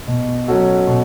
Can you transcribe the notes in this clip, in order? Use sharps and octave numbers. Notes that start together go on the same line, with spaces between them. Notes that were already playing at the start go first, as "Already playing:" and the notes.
B2
F#3 C#4 F#4 A4
B2